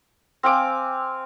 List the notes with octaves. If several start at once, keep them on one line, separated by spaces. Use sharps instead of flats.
C4 F5 G#5 D6